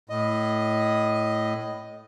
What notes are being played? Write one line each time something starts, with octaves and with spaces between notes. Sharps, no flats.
A2 D#5